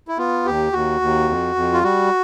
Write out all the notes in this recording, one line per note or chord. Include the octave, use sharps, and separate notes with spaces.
E4
B3 F4
D#2 G4
D#2 F#4
D#2
F2
F2
F4
G3 F#4